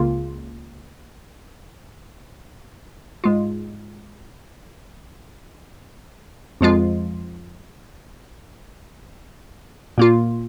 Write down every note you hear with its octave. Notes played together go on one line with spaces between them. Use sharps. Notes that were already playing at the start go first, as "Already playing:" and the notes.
Already playing: C#2 C#3 A#3 F4
G#2 G#3 F4
F2 F3 G#3 F4
A#2 A#3 F4